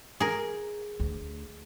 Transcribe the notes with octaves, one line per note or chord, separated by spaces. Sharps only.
G#4 A#4
D2